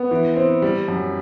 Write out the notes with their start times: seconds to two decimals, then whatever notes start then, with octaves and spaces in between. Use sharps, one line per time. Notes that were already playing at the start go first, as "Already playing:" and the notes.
Already playing: B3
0.11 E3
0.36 C4
0.62 G3
0.88 F#2